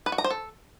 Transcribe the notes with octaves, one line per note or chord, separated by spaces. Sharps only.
B4
F#4
A#5
C5
A4